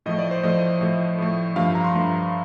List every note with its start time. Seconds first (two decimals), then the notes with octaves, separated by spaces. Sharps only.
0.06 A2 F3 A3 D#5
0.19 D5
0.31 C5
0.43 A2 F3 A3 D#5
0.81 A2 F3 A3
1.18 A2 F3 A3
1.56 G2 F3 A3 F5
1.75 A#5
1.84 C6
1.94 G2 F3 A3